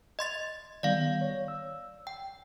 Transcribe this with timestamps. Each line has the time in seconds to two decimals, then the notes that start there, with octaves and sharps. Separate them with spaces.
0.19 D#5 C6 A6
0.83 D#3 G3 B3 D5 F5
1.21 C#5
1.48 E6
2.07 G5